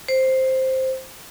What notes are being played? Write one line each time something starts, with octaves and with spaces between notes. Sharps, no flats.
C5